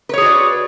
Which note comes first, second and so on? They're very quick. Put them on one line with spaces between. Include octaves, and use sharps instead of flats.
B4 C#5 G#4 F#4 D5